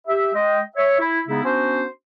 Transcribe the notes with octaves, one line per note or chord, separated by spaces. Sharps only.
G4 E5
G#3 D#5 G5
C#5 E5
E4
C#3 G#3 B3 D#4 E4
B3 C#4 D4 F#4 C5